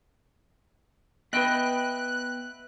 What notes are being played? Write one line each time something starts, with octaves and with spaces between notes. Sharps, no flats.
B3 B4 D#5 E5 G5 F#6